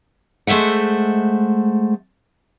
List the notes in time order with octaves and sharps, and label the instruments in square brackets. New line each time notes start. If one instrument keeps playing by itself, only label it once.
[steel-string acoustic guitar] G#3 A3 C5 E5 F#5